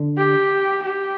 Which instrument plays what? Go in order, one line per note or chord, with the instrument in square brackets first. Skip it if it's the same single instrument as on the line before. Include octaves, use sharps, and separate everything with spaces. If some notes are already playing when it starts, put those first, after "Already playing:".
Already playing: [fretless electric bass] D3
[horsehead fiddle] G4
G4